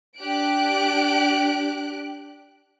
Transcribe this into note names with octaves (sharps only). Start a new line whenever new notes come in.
D4 G4 F#6 D7